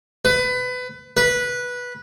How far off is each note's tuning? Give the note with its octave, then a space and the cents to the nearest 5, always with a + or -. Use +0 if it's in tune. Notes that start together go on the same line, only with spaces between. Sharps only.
B4 +25
B4 -10